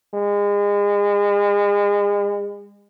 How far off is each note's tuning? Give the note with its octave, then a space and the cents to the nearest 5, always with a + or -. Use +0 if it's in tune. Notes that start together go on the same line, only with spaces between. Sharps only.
G#3 -35